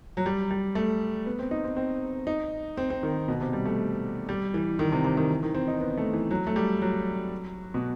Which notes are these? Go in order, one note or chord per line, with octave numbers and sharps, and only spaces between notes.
F#3
G3
G3
A3
B3
C4
D#4
C4
C4
D#4
C4
C4
D#3
B2
C3
G3
A3
G3
E3
D#3
C3
C3
D#3
E3
D#3
C4
D#4
B3
A3
E3
F#3
A3
G3
F#3
B2